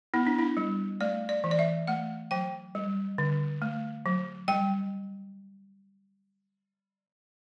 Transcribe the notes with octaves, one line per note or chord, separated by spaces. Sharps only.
B3 E4
D4
E4
G3
A3 D5
D5
E3
D5
E5
A3 F#5
F#3 G5
G3
D3
A3
F#3
G3 G5